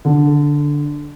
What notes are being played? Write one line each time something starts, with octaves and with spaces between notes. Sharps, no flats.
D3